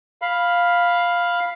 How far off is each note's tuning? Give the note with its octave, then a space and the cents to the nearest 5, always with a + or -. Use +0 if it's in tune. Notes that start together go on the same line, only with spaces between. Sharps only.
F5 +5 B5 +0